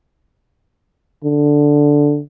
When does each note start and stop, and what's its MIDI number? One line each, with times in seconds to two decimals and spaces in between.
1.24 2.21 50